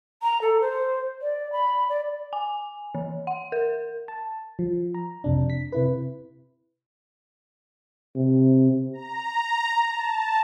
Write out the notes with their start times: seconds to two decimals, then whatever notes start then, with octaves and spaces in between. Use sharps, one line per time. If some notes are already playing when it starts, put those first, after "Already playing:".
0.22 A#5
0.41 A4
0.61 C5
1.22 D5
1.52 B5
1.89 D5
2.33 G#5
2.95 E3
3.27 F#5
3.52 A#4
4.08 A5
4.59 F3
4.94 A#5
5.24 F2 C3 D4
5.50 B6
5.72 C3 E4 B4
8.15 C3
8.93 A#5
9.85 A5